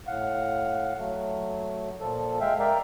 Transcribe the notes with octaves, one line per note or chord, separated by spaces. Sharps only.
A2 F5 F#5
F#3 A3
A#2 F3 A4
G#3 E5 F5 G5
A#4 D5 E5 F5 G5 A#5